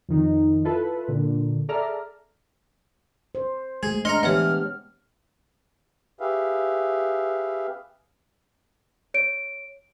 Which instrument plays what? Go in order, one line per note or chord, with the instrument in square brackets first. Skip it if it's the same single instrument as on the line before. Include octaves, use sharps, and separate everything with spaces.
[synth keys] F2 D#3 D#4
E4 F4 A4 B4
A#2 D3
G#4 A4 D5 E5 A#5 F6
[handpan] C5
[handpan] G#3 A3 [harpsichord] G#4 [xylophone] G#6
[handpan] D4 [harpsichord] D#5 A#5 [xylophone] C6 C#7 [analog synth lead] F6
[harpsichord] E3 [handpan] B3 G4 [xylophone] C#5 F#5
[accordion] G4 G#4 B4 E5 F5
[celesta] C#5 D7